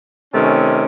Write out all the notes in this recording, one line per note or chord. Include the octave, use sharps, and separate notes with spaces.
C3 D#3 A3 C#4